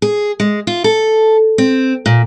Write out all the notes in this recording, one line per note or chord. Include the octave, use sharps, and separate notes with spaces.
G#4
G#3
F4
A4
C4
A#2